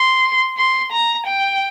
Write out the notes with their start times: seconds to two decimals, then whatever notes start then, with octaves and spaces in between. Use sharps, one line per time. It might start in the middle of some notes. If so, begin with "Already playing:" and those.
Already playing: C6
0.58 C6
0.92 A#5
1.26 G5